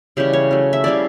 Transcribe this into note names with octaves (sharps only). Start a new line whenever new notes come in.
C#3 E3 G3 C#4 G4
C#5
F#3 A3 C#4
E5
C#3 G3 C#4 E4 D5